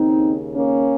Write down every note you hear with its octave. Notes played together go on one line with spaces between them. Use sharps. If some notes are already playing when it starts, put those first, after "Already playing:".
Already playing: D#2 C#3 C4 D#4
A#3 C#4